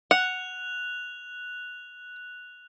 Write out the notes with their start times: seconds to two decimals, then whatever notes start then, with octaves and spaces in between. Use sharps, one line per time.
0.11 F#5 F#6 F7